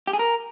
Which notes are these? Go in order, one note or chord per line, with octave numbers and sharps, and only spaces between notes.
G4
G#4
A#4